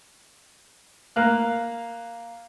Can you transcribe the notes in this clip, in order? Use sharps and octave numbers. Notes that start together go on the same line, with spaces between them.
A#3 F5 F#6